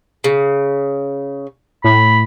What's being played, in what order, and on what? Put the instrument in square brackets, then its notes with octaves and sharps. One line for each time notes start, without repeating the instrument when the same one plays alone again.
[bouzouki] C#3
[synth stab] A2 [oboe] B5